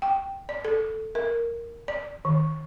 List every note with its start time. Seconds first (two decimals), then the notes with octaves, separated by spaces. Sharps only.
0.02 G5
0.49 D5
0.65 A4
1.15 A#4
1.88 D5
2.25 D#3